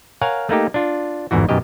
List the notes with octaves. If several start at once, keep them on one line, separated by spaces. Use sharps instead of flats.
A#4 C#5 F5 F#5 G#5
A3 A#3 D#4 G4
D4 F4
G1 E2 G#2 E3 F#4
F#2 B2 D#3 G4 D#5